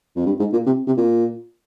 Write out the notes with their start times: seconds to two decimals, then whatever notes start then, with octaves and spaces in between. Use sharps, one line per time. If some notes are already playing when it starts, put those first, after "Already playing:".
0.16 F2
0.26 G2
0.39 G#2
0.53 A#2
0.66 C3
0.87 C3
0.97 A#2